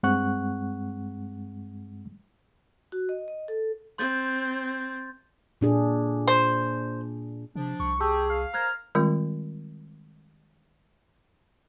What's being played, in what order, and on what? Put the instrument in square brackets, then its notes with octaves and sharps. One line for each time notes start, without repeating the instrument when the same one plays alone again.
[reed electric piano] G2 G#3 C4 F#5 C#6 F#6
[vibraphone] F#4
D#5
D#5
A4
[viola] C4 [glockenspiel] C6 G6 A6
[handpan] A#2 D4 G#4
[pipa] C5
[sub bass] C3 [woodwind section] F3 D4
[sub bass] C2 [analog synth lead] C#6
[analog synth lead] G4 [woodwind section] G#4 [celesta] A5 C#6 E6
[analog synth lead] F5
[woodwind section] A#4 C5 A#5 [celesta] F6 F#6 G#6
[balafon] D#3 G3 G#3 C4 F4